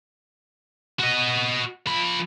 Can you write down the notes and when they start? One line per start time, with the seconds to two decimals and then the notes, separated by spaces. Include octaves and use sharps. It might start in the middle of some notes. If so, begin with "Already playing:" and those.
0.99 F#4 D#5
1.87 F3 B5